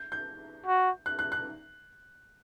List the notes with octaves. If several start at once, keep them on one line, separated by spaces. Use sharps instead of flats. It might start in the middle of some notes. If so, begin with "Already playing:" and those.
Already playing: G6
G6
F#4
F#6
F#6
F#6